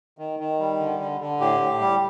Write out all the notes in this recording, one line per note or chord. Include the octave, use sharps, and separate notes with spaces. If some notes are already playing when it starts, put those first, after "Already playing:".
D#3
D#3
G3
D3
D3
D3
A2 G4
A2
G3